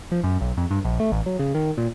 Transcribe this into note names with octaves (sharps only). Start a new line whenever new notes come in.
F3
F#2
B1
F2
G2
A#1
A3
A1
F#3
C#3
D#3
A#2